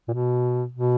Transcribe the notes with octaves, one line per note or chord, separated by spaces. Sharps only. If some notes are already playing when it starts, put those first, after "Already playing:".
A#2
B2
B2